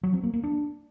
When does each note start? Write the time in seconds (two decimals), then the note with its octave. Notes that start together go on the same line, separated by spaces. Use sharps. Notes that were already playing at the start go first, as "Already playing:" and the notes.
0.03 F#3
0.13 C4
0.23 A#3
0.33 A#3
0.43 D4